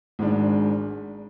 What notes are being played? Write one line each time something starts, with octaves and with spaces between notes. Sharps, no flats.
G#1 G#2 G#3 D4